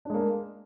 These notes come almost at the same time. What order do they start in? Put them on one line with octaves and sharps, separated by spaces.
D4 G#3 A#3